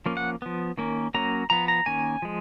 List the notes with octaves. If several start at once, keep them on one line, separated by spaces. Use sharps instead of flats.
F3 A#3 C#4
F#5
F3 B3
D#3 A#3 C#4
F#3 A#3 C#4 A#5
F3 B3 A#5
A#5
D#3 A#3 C#4 G#5
F3 G#3